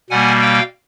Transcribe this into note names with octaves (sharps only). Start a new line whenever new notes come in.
B2 G3 A#3 F#5 G#5
F5 G5